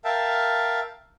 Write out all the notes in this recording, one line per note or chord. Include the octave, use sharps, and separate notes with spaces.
A#4 E5 F5 G5 A5